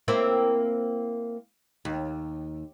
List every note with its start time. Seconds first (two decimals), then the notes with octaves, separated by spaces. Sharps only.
0.08 A#3 C4 E4
1.85 D#2